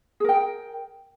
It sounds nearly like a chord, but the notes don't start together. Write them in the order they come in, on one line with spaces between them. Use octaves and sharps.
G#4 A#4 G5